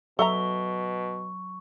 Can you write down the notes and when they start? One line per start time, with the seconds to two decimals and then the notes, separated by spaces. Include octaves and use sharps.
0.19 B2 F#3 A4 E5 A#5 C#6